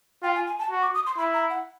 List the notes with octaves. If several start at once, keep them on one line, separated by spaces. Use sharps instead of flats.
F4 G5
G#5
G#5
A5
F#4
D6
D#6
C6
E4 B5
A#5
F#5